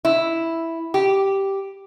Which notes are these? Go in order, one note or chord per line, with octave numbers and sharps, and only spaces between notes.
E4
G4